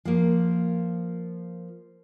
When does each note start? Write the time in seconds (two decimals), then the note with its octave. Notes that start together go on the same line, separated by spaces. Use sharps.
0.05 F3 A#3